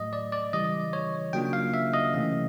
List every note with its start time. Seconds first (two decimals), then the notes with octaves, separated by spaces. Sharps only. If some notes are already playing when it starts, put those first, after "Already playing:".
Already playing: A2 F#3 A3 D#5
0.13 D5
0.32 D5
0.53 C#3 E3 G3 D#5
0.93 C#5
1.33 C#3 F#3 A#3 D4 F4 G5
1.53 F5
1.74 E5
1.93 D#5
2.14 C3 E3 A3 C#4